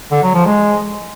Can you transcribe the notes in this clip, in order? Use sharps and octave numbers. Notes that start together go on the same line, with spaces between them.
D3
F#3
F3
G#3